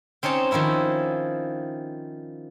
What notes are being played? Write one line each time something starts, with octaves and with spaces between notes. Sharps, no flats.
C4 C#4 D#4 C#5 A5
D#3 F3 C#4 E4 C#5